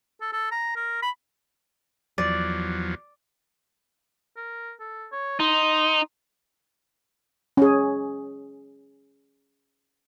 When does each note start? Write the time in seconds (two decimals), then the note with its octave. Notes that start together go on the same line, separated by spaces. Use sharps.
0.21 A4
0.33 A4
0.51 A#5
0.76 A#4
1.02 B5
2.18 E2 F3 F#3 D5
4.36 A#4
4.80 A4
5.12 C#5
5.40 D#4 C6
7.57 C#4 G#4